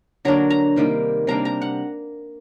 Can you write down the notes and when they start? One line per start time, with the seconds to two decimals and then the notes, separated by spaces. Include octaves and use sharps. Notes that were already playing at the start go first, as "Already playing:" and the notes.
0.25 D3 F#3 A#3 D4 A#5
0.50 A#5
0.76 C3 D#3 G3 A#3
1.27 C3 G3 A#3 D4 A#5
1.45 A#5
1.62 F#5